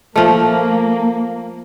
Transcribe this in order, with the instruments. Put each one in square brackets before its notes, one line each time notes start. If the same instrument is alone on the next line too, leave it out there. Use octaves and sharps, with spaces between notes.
[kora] F3 A3 [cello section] A#3